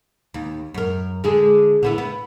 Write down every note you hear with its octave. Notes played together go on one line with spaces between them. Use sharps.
D#2
F#2 A#4
D3 G#3 G#4
D3 B3 E4
B3